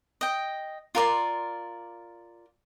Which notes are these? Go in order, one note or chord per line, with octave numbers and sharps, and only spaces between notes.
D#5 G5
F4 A#4 D5 C6